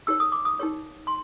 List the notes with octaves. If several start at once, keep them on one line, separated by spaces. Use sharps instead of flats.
D#4 G4 A#4 C#5 E6
D#6
D6
D#6
D#4 G4 A#4 C#5
C6